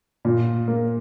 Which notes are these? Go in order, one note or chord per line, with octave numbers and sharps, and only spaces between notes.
A#2
A#3